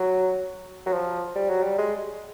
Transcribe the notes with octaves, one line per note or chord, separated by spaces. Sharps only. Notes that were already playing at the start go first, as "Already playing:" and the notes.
Already playing: F#3
F#3
F3
G3
F#3
G3
G#3